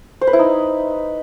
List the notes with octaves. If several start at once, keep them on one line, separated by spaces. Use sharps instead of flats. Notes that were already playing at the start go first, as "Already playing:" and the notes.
C5
B4
E4
D#4